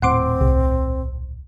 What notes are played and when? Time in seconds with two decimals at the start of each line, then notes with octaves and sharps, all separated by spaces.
0.02 D#1 A2 C4 F#5 C6 D6
0.41 C2